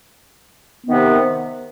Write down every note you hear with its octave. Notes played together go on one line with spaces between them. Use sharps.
C3 D#3 B3